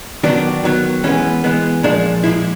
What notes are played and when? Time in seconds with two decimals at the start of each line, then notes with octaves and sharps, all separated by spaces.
0.23 D#3 F#3 B3 D4
0.63 D#3 F#3 B3
1.04 E3 G#3 B3 C#4
1.44 E3 G#3 B3
1.83 A#2 F3 G#3 D4
2.23 A#2 F3 G#3 E4